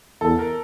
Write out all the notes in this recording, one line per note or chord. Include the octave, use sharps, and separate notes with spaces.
E2 A4
A#4